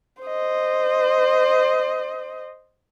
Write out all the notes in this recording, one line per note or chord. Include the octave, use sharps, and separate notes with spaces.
C5 D#5